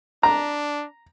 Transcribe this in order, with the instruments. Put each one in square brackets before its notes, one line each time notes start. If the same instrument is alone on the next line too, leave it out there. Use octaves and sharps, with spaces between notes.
[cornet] D4 [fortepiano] A#5